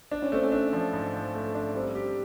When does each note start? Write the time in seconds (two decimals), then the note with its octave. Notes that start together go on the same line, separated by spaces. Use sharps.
0.12 D4
0.22 C#4
0.32 A3 C4
0.43 C#4
0.52 D4
0.73 F3
0.93 G#2
1.14 F3
1.34 A3
1.55 D4
1.74 G3 C4
1.95 G4